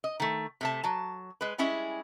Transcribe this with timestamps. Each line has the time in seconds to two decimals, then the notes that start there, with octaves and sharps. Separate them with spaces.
0.04 D#5
0.20 D#3 A3
0.61 C3 A3 A5
0.83 F#3 A5
1.41 G#3 B4
1.58 G3 G#3 C#4 E4 G#4